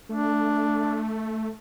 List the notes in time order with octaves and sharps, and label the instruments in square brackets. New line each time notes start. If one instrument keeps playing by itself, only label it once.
[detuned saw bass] A3 [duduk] D4